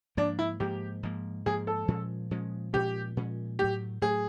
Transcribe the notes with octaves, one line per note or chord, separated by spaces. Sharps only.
G#2 F3 A#3 D4
E4
G#2 F3 A#3 G4
G#2 F3 A#3
G#2 F3 A#3 G#4
A4
A#2 F3 G#3 C#4
A#2 F3 G#3 C#4
A#2 F3 G#3 C#4 G4
A#2 F3 G#3 C#4
A2 F#3 A3 G4
A2 F#3 A3 G#4